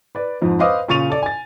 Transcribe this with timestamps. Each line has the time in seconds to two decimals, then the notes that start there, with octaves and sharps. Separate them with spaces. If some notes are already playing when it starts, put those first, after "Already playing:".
0.15 B4 D5
0.41 F2 G#2 F3
0.59 B4 C5 D#5 F5 D6 D#6
0.88 A#2 C#3 C#6 A6 D#7 F7
1.10 A4 D5
1.22 G#5 A6